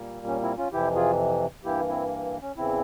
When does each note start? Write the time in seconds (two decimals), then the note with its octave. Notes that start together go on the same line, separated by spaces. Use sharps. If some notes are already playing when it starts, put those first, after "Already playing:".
Already playing: A#2 G3 A#3
0.26 C#4
0.42 C4 E4
0.57 C#4 F4
0.72 F2 C3 E3 E4 G4
0.95 F4 G#4
1.64 G2 E3 A#3 E4 G4
1.88 C4 E4
2.41 C#4
2.57 E2 C#3 E3 C4 E4